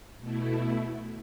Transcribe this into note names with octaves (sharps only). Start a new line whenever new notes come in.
B2 A3 E4